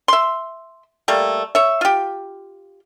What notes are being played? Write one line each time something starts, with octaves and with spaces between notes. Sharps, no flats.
E5 C6
G3 A3 A#3
C#5 E5
F4 G4